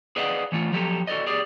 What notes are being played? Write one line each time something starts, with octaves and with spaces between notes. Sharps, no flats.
G#4 B4 D5 D#5 F5 F#5
E3 A3 F4
F3 F#3 G4 A4
F#4 A4 C5 D5 D#5
G4 G#4 D5